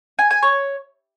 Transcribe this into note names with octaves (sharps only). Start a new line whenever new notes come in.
G#5
G#5
C#5